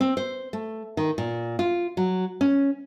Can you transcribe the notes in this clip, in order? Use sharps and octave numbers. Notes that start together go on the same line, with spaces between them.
C4
C5
A3
D#3
A#2
F4
F#3
C#4